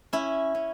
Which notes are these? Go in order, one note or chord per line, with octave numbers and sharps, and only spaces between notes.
C#4 E4
C#4